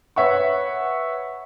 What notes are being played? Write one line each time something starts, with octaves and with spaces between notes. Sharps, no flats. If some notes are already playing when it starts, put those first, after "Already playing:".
B4 C#5 E5 F#5 C#6